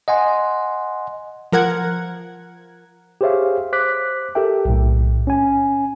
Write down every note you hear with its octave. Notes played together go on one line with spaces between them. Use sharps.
D#5 F#5 G#5 C6
F3 A#4 F#5 G#6
G4 G#4 C5 C#5 E5 F5
C5 D6 F#6 B6
G4 A4 A#4 E5 G5
B1 A2
C#4 G#5